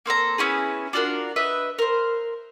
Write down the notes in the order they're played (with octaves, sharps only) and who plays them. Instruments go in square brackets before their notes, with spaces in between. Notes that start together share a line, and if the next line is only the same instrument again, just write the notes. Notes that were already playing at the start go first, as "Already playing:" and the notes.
[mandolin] A#3 C4 A4 A#5
B3 C#4 E4 G#4
D4 F4 F#4 A#4
B4 D#5 E5
A#4 C5